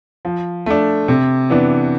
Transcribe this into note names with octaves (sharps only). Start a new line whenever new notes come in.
F3
A3 D4
C3
E3 B3 D4